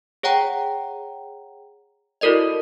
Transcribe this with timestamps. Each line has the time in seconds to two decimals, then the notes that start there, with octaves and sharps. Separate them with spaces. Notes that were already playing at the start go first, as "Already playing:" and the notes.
0.23 G#4 C#5 F#5 G5 A#5
2.21 E4 F#4 A4 A#4 D5 D#5